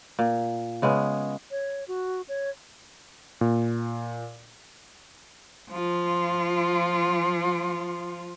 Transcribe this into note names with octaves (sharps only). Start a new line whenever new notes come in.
A#2
C#3 G#3 B3 C#4
C#5
F#4
C#5
A#2
F3 F4